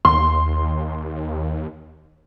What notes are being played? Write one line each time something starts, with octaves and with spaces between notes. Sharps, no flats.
D#2 C6